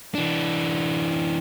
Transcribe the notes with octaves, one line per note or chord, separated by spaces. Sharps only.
E3 D4